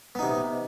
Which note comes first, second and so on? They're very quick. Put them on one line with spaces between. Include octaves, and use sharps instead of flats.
B3 D#4 C3